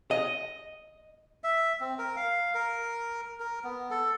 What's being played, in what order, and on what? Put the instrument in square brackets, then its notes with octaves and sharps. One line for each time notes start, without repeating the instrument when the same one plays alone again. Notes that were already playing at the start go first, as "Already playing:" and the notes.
[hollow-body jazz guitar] D#5
[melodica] E5
C4
A#4
F5
A#4
A#4
B3
A4